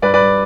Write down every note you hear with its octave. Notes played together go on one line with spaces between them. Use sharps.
G2 B4 D5
B4 D5
G2